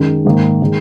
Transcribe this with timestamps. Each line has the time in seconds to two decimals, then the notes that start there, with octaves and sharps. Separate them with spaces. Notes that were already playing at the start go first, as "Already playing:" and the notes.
Already playing: F#2 D#3 G#3
0.25 G#2 D#3 A#3
0.62 D#3 G#3